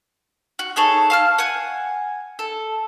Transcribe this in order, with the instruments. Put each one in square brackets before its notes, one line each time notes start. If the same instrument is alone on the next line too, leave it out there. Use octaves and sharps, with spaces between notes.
[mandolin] F#4
D#4 G#4 A4 C#5
F5 A5 F6
F#5 G#5
A4